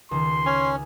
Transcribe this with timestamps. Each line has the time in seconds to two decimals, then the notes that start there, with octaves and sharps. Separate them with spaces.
0.11 C#2 D#3 C6
0.46 C#4 G#5 F6 G#6